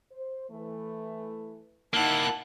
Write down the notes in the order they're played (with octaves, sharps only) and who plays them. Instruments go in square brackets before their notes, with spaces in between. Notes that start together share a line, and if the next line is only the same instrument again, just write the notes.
[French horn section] C5
E3 A3
[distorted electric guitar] A#3 E4 [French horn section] D#4 [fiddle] F#5 F#6 [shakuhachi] A5